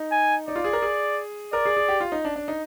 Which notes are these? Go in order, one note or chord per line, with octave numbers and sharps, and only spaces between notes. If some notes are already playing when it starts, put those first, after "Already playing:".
Already playing: D#4
G#5
D#4 D5
F4
G#4
A#4
G#4
A#4 D5
G#4
G#4
G4
F4
D#4
D4
D4
D#4